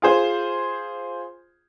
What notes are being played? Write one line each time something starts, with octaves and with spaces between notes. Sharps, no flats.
F4 G#4 C5